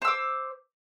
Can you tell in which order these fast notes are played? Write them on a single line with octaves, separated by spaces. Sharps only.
C5 E6 D6